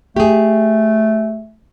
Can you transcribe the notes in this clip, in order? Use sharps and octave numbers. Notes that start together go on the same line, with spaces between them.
A3 G4 G#4